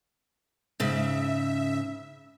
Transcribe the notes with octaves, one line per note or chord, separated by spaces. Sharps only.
G#2 C#3 E5